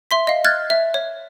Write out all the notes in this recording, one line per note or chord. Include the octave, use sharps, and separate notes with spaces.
E5 C6 B6
D#5 F5
F6 F#6 G#6 A6
E5
C#5